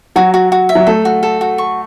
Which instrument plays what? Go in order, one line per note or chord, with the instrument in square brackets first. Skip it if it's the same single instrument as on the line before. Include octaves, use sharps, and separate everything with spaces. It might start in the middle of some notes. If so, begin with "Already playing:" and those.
[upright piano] F#3 [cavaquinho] F#4
[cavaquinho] F#4
F#4
E5
[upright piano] F#3
[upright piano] A3 [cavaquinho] A4
[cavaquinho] F#4
A4
F#4
C#6